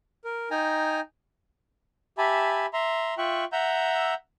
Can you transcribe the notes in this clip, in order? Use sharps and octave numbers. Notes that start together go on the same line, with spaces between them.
A#4
D#4 G5 G#5 A#5
G4 E5 G#5 A5 B5
E5 A#5 C6
F4 E5 G5 C#6 F#6
E5 F#5 A#5 E6 G6